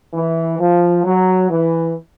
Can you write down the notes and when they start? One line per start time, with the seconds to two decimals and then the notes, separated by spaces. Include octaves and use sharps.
0.13 E3
0.59 F3
1.04 F#3
1.50 E3